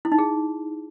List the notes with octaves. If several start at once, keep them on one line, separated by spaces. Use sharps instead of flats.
E4
D#4
G#4